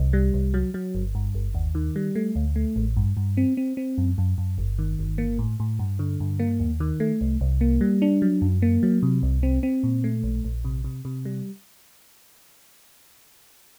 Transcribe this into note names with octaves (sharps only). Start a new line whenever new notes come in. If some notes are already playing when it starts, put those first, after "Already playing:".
Already playing: C2
G3
C2
F#3
F#3
G1
G2
G1
D#2
D#3
G3
A3
D2
A3
A1
G2
G2
C4
C4
C4
F#2
F#2
F#2
G1
D#3
G1
A#3
A2
A2
G2
D3
G2
A#3
D#2
D#3
A3
C2
C2
A#3
G3
D4
F#3
F#2
A#3
F#3
C3
C2
C4
C4
A#2
A3
A#1
A#1
C3
C3
C3
G3